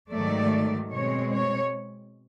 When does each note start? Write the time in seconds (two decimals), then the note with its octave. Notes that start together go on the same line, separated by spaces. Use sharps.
0.11 G#2 D#3 F#3 A3 D5
0.91 B2 G#3 C4 C#5
1.32 C#5